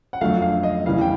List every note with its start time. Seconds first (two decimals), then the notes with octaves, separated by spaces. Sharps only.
0.13 F#5
0.21 F2 D3 F#3 A3 F5
0.42 F5
0.63 D#5
0.86 E2 C#3 E3 G3 F5
1.01 G5